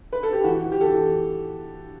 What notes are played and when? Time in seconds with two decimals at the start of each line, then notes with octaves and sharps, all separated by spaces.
0.12 B4
0.23 A4
0.33 G4
0.44 E3 F#4
0.65 E3
0.72 G4
0.81 A4
0.85 E3